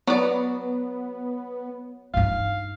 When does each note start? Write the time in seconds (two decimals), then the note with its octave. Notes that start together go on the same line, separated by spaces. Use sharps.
0.07 F#3 B3 D5
2.14 G2 D#4 F5